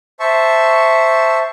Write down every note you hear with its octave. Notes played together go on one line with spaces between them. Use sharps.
C5 E5 A5 C#6